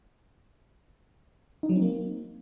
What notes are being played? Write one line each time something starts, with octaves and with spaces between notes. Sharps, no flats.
D#4
F#3
C4
A#3